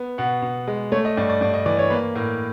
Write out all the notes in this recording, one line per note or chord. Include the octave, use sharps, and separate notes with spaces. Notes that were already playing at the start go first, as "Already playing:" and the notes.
Already playing: B3
B2 F#5
B2
G#3
A3 C#5
D#5
G2 D5
D5
G2 D5
D#5
E3 D5
C#5
A#3 B4
A2 A#4